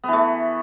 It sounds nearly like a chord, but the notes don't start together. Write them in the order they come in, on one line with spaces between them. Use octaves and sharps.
B3 E3 A3